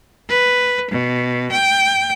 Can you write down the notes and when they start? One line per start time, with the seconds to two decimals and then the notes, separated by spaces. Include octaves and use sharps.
0.29 B4
0.91 B2
1.52 G5